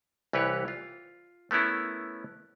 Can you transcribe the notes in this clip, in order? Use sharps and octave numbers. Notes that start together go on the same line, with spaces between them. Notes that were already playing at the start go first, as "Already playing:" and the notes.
C2 E3 G4 B4 C#5
F4
A3 B3 C#4 E4 A#4